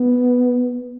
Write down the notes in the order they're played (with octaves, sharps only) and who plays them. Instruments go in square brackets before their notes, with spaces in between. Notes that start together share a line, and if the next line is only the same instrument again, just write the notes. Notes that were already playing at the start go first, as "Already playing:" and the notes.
Already playing: [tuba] B3